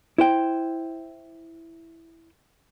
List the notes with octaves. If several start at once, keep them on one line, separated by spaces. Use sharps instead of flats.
E4 C5 G5